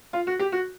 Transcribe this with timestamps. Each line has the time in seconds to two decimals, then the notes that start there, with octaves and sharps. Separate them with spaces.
0.13 F4
0.27 F#4
0.39 G4
0.52 F#4